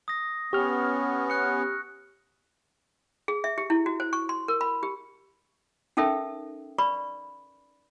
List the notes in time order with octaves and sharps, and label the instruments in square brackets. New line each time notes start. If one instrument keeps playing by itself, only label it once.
[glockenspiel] D#6 A#6
[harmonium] B3 C#4 [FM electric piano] G4 F6 [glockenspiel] C#6
[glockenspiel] F#6 C#7
[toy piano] G#4
E5
G4
E4
F#4
C5
C#6
C6
A#4
B5
G4
C#4 D#4 A4 A#4 E5 G5
B4 D5 B5 C#6